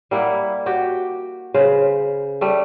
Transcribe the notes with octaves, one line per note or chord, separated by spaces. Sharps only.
G3 A#3 E4 F#5
F#4 G4 G5
C#3 B4 C5
G3 A3